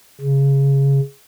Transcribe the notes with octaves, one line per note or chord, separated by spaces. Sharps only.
C#3